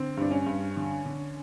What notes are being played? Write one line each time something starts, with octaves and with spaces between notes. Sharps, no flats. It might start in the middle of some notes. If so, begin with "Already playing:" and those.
Already playing: D3 C4
G2 D4
C#4
G2
D3
D3